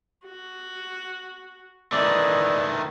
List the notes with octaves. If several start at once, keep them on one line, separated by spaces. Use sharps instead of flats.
F#4
D#3 E3 A3 D5 D#5